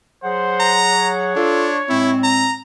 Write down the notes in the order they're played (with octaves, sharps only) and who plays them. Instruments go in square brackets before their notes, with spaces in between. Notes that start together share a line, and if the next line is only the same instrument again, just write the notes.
[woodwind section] F#3 G#4 F#5 [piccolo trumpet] C5
[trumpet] A#5
[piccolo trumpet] C#5
[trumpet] D4 [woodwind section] F4 A4
[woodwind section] A2 G#3 C4 [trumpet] E4
[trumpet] A#5